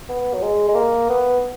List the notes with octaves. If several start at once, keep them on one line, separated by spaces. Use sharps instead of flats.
B3
F#3
G#3
G#3
A#3
B3